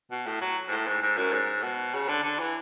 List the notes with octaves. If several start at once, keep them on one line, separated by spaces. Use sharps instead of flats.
B2
A2
F#3
G#2
A2
G#2
G#2
F#2
G#2
B2
C#3
D3
D3
E3